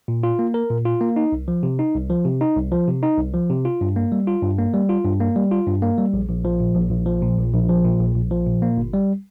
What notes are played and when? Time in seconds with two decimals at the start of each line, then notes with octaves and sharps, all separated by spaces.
0.08 A#2
0.23 F4
0.39 A#3
0.54 A#4
0.70 A#2
0.85 F4
1.01 A#3
1.16 D#4
1.32 C2
1.48 F3
1.63 C3
1.79 D#4
1.94 C2
2.10 F3
2.25 C3
2.41 D#4
2.56 C2
2.72 F3
2.88 C3
3.03 D#4
3.18 C2
3.34 F3
3.49 C3
3.65 F4
3.81 G2
3.96 A#3
4.12 G3
4.27 F4
4.43 G2
4.58 A#3
4.74 G3
4.89 F4
5.05 G2
5.20 A#3
5.36 G3
5.51 F4
5.67 G2
5.82 A#3
5.98 G3
6.13 A#1
6.29 A#1
6.45 F3
6.60 A#2
6.76 A#1
6.91 A#1
7.06 F3
7.22 A#2
7.38 A#1
7.53 A#1
7.69 F3
7.84 A#2
8.00 A#1
8.15 A#1
8.31 F3
8.47 A#2
8.62 A#3
8.77 G1
8.94 G3